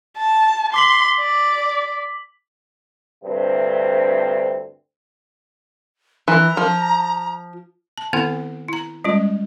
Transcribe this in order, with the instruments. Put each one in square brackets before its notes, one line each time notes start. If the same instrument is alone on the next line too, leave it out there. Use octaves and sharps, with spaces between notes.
[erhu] A5
[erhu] C6 [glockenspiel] D6 B6 F#7
[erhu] D5
[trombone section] D2 G2 C3 C4
[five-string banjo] E3 [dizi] A#5
[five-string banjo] F3
[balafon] A5
D#3 B3 C4 E4 A4 F#5
E4 A#5
G3 G#3 C#4 F4